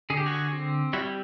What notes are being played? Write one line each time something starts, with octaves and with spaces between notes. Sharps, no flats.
D3 G#4
G4
F#4 G#4
C4
G3 E4 F#4